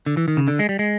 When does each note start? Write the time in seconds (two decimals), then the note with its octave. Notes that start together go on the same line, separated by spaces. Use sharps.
0.06 D3
0.17 E3
0.28 D#3
0.37 C#3
0.48 D3
0.59 G#3
0.69 G3
0.79 G#3